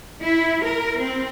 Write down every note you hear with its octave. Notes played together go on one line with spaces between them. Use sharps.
E4
A#4
C4